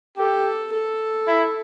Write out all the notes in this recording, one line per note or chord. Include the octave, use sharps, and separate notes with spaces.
G4 A4
A4
E4